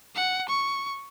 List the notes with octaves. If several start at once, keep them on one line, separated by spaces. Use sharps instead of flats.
F#5
C#6